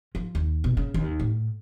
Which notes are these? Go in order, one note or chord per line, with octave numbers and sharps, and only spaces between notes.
F3
D#2
B2
C#3
D#2
A2